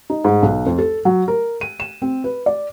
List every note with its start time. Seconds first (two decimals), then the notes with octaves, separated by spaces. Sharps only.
0.10 D#4
0.25 G#2
0.43 B1
0.66 F2
0.78 A4
1.05 F#3
1.28 A#4
1.61 D#7
1.80 E7
2.02 C4
2.24 B4
2.46 D5